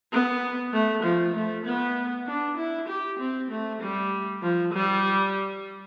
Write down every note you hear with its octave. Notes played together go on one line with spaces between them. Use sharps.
B3
A3
F3
A3
B3
D4
E4
G4
C4
A3
G3
F3
G3